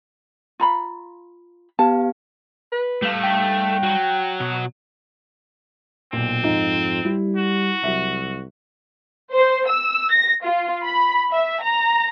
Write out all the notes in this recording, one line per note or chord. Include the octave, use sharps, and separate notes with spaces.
F4 A#5 B5
B3 G4 F5 A5
B4
G3 A3 F5
G5
F#3
B2
B1 A#2 C4
F2 G#2 D#4 F4
G3 E4
F#4
C2 F#3 E5
C5
E6
A#6
F4
B5
E5
A#5